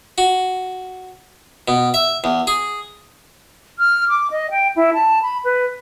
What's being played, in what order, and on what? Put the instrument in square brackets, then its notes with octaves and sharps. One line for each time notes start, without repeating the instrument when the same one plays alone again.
[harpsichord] F#4
B2
E5
E2
G#4
[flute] F6
D6
D#5
G5
E4
A5
B5
B4